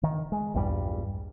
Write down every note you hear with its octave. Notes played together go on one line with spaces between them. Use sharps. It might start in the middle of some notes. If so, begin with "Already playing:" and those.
D#3
G#3
A#1 E2 G2 G3